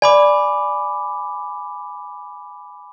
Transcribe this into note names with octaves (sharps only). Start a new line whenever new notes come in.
D5 G#5 B5 D6